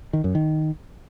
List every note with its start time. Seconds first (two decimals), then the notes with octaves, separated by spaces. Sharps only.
0.13 D#3
0.24 F#2
0.35 D#3